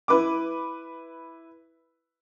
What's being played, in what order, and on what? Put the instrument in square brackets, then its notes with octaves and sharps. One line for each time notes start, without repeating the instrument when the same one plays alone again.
[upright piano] E4 B4 D6